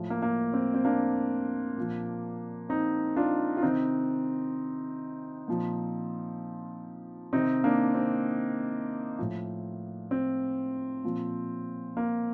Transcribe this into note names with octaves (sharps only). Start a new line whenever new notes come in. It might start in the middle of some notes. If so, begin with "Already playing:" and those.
Already playing: A2 F3
A#3
A#3
C4
C4
A#3 D4
A#2 F3
C4 D#4
D4 F4
F4
C3 D#3 C4 D#4
A#2 F3
C3 D#3 C4 D#4
A#3 D4
C4
A2 F3
C4
A#2 F3
A#3